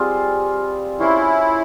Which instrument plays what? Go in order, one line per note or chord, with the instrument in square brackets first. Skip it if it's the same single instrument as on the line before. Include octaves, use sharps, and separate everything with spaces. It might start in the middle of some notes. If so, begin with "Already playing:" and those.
Already playing: [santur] G3 C4 F4 G#4
[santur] C#4 F4 C5 [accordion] E4